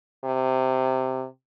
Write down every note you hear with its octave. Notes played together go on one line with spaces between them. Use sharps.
C3